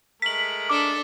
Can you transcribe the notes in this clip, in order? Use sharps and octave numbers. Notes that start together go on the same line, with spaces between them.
G#3 A3 A#4 B6 F#7
D4 A4 D6